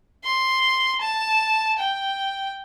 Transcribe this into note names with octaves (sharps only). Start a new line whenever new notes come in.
C6
A5
G5